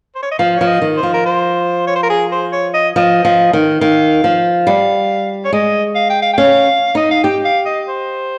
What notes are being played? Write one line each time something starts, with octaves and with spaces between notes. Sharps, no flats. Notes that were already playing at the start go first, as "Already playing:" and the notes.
C5
C#5
D#5
F3 F5
F3 C#5
D#5
D#3
C5
F3
A#4
C5
C#5
C5
A#4
G#4
C5
C#5
D#5
F3 D#5
F3
D#3
D#3 F5
F3
G3 F5
C#5
G#3 D#5
F5
G5
F5
G5
C#4 F5
D#4 D#5
F5
G4 G5
F5
D#5
C5